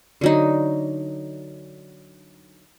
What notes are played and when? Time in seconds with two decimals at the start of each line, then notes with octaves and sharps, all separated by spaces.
0.21 D3 F#3 D#4